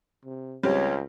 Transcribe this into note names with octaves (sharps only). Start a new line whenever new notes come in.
C3
C#2 G3 C4 G4 C#5